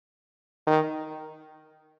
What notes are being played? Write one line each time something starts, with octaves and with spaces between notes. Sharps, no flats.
D#3